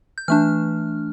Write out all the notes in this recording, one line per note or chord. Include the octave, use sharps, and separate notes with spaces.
G6
E3 A3 D4 F6